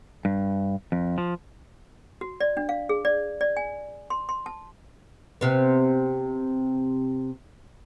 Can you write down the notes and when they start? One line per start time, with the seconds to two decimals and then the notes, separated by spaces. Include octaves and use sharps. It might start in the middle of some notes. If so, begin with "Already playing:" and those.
0.25 G2
0.92 F2
1.18 F3
2.21 F#4
2.40 D5
2.57 D4
2.69 F5
2.89 G#4
3.05 D5
3.41 D5
3.57 G#5
4.10 C6
4.29 C6
4.46 A5
5.41 C3 B3